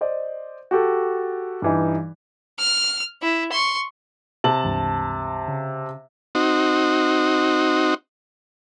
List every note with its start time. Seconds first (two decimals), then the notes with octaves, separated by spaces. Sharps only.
0.01 C5 D5 D#5
0.71 F#4 G4 A4
1.62 G2 E3 D#4
2.59 F6
3.22 E4
3.52 C6 C#6
4.44 C3 A5 F#7
4.64 C#2 G2 E3
5.48 C#3
6.35 C4 D#4 F#4